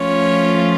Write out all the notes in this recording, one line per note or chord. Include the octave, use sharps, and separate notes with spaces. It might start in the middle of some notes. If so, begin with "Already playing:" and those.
Already playing: F3 A3 C#4 F4 C#5